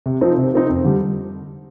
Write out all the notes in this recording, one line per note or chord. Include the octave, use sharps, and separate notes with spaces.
C3
F3 C4 D#4
C3
F3 C4 D#4
F2
D3 G3